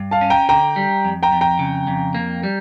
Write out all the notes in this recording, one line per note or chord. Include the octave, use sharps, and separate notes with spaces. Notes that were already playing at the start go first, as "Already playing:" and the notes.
Already playing: G2
F5 A5
C#4
G5 A#5
D3 G5 A#5
G3
F2
G5 A#5
F2
G5 A#5
C#3
F2
A#3
G3